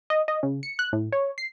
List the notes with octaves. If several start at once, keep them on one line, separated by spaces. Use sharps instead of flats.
D#5
D#5
C#3
C#7
F#6
A2
C#5
C7